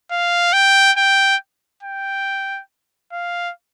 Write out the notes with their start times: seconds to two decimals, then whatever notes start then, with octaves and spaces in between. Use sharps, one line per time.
0.11 F5
0.53 G5
0.97 G5
1.83 G5
3.12 F5